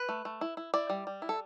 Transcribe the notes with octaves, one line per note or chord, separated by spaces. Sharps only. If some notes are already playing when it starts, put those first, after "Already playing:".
Already playing: B4
A3
A3
E4
E4
E4 D5
G3
G3
E4
A4